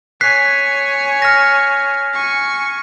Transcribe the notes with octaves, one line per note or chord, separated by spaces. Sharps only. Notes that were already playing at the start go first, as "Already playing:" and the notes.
C#5 G#5 F#6 B6 C7
F6 A#6
G#5 C#6